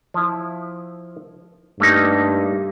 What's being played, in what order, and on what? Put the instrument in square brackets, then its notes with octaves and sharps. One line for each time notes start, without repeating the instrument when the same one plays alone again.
[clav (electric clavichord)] F3 E4
[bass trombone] G2 [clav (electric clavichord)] A3 A#3 D#4